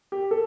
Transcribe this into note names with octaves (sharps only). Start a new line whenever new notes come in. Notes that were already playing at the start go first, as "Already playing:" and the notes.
G4
A4